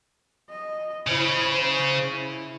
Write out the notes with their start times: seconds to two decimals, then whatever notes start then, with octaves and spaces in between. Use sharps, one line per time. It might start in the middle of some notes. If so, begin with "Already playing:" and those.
0.49 D#5
1.07 C#3 E4 C5
1.50 C5
2.10 E4